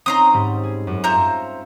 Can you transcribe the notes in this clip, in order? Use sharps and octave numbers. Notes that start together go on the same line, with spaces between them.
C4 C#4 D#4 A#5 C6 D#6
G#2 G3
G#4
F#2
F4 C5 E5 A#5 C#7